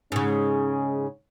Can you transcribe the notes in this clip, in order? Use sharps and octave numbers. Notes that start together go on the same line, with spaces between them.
G#2 C#3 C#4 G#4